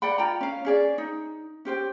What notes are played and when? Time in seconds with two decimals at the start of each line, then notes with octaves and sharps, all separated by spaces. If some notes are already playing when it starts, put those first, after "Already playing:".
0.02 D5 F#5 G5 B5
0.18 F4 G5 A#5
0.41 C#4 F5
0.65 C#4 G#4 D5
0.98 D#4
1.65 C#4 G4 C5 G5